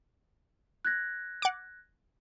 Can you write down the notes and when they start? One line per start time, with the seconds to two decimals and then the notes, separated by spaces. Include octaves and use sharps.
0.85 F#6 G#6 A#6
1.42 F#5 D6